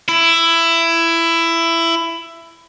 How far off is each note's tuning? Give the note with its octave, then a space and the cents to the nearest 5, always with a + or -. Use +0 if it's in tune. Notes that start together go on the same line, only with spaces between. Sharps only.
E4 +15